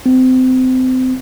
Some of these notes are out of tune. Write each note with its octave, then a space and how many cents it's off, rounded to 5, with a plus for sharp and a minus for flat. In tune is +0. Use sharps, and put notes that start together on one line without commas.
C4 -30